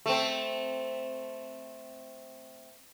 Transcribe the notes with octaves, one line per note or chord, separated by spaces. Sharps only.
A3 C4